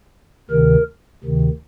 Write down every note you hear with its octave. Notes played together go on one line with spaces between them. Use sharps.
D2 C3 D#3 A#4
D2 C3 D#3